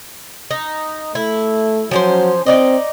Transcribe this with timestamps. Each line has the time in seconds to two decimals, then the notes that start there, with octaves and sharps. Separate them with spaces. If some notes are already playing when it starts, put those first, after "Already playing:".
0.51 D#4
1.15 A3 E4
1.91 F3 F#3 C#4 C5
2.46 C4 D#4 D5 D#5